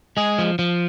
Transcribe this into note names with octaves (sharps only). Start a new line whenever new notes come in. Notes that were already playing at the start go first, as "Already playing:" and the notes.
G#3 G#4
F3
F3